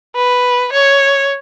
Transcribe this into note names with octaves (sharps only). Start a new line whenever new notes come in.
B4
C#5